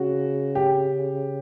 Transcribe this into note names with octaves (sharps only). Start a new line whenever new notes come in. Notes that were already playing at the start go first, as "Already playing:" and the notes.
Already playing: C#3 F#4
G4